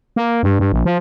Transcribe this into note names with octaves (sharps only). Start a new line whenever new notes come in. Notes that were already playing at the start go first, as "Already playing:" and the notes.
A#3
G2
G2
A#1
F3